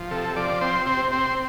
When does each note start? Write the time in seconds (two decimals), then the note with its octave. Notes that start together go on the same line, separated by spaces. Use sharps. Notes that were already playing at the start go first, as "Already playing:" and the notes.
Already playing: F3
0.11 C3 A4
0.36 F3 D5
0.61 C4 C5
0.86 C3 C5
1.12 C4 C5